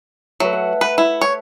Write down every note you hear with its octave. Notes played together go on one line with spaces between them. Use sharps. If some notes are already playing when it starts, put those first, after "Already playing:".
F#3 A3 B4
F#5
B4
E4
C#5